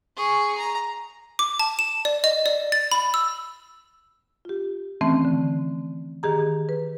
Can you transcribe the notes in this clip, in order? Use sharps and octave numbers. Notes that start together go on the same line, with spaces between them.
G#4 C#6
A#5
D6
A5
E7
D5
D#5
D5
A6
B5
E6
F4 G4
D#3 E3 A3 C4 C#4
D3
D#3 G4 G#4 A#5
B4